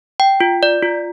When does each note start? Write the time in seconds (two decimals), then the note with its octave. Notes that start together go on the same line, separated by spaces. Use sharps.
0.20 G5
0.40 F4
0.63 D5
0.83 F4